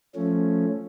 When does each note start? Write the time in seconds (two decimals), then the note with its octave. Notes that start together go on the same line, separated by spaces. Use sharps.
0.15 F3 A3 C#4